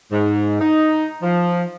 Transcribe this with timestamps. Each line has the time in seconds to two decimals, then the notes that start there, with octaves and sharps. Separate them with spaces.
0.12 G#2
0.61 D#4
1.23 F3